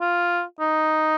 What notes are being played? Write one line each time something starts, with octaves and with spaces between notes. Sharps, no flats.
F4
D#4